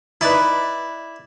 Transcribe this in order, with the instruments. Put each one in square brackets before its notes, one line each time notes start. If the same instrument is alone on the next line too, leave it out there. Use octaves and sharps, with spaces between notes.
[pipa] D#4 B4 [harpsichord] E4 D5